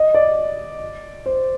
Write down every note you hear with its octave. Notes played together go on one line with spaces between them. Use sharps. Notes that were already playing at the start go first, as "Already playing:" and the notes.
Already playing: D#5
D5
C5